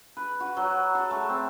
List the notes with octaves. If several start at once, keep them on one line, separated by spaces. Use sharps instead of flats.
B4
F#4
F#3
A4
A3
C4